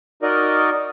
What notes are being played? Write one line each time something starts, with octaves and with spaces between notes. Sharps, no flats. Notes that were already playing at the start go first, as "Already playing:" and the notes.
D#4 F#4 A#4 D5 D#5